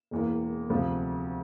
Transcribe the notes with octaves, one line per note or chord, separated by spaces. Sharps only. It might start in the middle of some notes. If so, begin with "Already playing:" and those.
E1 E2 E3 A#3
D2 C3 F3